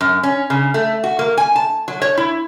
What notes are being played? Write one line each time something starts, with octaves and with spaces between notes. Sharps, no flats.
F#2
C#4
C#3
A3
F#4
A#3
G#5
A5
F#3
C#5
E4